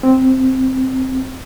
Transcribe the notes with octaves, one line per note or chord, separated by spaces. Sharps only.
C4